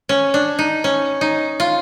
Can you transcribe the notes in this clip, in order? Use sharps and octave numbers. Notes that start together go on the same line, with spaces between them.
C#4
D4
D#4
C#4
D#4
F4